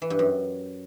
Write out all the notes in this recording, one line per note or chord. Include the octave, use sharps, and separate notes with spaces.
E3
G2
F#2